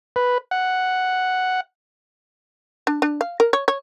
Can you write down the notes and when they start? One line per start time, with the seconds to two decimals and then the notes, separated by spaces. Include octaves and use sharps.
0.16 B4
0.51 F#5
2.87 D4
3.02 D4
3.21 F5
3.40 A#4
3.53 C#5
3.68 C#5